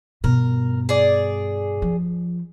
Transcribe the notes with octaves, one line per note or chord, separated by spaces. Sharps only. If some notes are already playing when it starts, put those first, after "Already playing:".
G2 B2 A#4
G#4 D5
F3